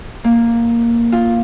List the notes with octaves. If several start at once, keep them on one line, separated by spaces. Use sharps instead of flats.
A#3
F4